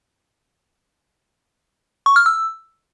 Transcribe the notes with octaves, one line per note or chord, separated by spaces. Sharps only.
C#6
F6
E6